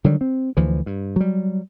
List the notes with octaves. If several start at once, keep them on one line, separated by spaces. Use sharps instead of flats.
D3 D#3 F#3 G3
C4
D2 E3 F3
G2
F#3 G3